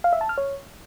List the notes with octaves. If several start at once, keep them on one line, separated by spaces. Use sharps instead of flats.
F5
E5
A5
F6
C#5